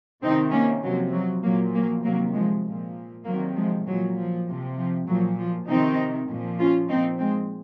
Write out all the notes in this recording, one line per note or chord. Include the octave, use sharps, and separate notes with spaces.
C3 D#3 C4 D#4
A#3 C#4
C3 F3 F#3
F#3
A#2 F3 F#3 A#3
F#3 A#3
C3 D#3 F#3 A#3
F3 G#3
A#2 F3
C3 D#3 F#3 A#3
F3 G#3
A#2 F3 F#3
F3
C3 F3
F3
A#2 F3 F#3
F3
C3 D#3 C4 D#4
A#2 F3
C#4 F4
A#2 F3 C4 D#4
G#3 C4